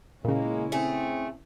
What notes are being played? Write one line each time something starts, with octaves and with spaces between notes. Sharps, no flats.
A#2 C#3 G#3 A#3 C#4 E4
A3 C4 G#4